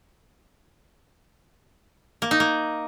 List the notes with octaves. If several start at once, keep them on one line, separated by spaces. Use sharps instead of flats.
A#3
D#4
A#3